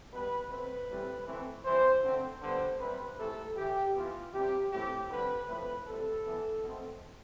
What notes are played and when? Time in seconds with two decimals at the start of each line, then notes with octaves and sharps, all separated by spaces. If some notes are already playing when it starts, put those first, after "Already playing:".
0.12 B2 G3 B3 B4
0.50 B2 A3 C4 B4
0.89 A2 E3 G3 C4
1.26 E3 A3 C4
1.65 E3 G3 C4 C5
2.03 D3 A3 C4
2.42 D3 G3 B3 C5
2.80 C3 G3 C4 B4
3.18 C3 E3 A3 C4 A4
3.57 A2 E3 A3 G4
3.95 E3 B3 F4
4.33 C3 G3 C4 G4
4.72 A2 E3 A3 C4 G4
5.10 D3 G3 C4 B4
5.48 A2 F3 A3 C4 B4
5.87 A2 G3 C4 A4
6.26 E3 B3
6.63 B2 A3 C4